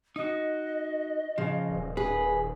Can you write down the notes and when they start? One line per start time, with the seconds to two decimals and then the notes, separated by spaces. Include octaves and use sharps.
0.16 D#4 F#4 D#5
1.38 C#3 F3
1.69 D#1
1.97 G#4 B4